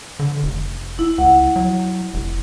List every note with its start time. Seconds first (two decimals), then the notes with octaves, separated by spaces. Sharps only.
0.19 D3
0.43 F1
0.99 E4
1.18 C#2 F#5
1.56 F#3
2.14 F1